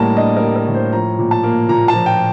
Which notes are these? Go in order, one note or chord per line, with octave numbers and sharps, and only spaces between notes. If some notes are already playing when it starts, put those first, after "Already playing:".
Already playing: A2 G3 A#3 A5 A#5
D4 D#5
A#4
G3
A#4
A2
C5
F3 A#5
A#2
A5
A#3
A#2 A#5
A5
F3
G5